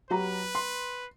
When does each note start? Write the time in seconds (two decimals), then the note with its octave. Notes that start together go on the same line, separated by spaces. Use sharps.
0.10 F#3 G4 B4 A#5
0.55 C6